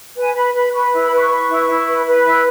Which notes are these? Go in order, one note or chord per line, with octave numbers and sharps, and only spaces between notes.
B4 G#5
B4 B5
B4 B5
B4 C#6
E4
B5
B4 C#6
B4
E4
E4
B4
B4
E4